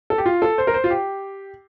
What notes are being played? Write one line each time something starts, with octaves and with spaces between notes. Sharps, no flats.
A4
G4
F4
A4
C5
A#4
C5
F4
G4